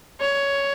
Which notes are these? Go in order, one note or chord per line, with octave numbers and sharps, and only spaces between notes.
C#5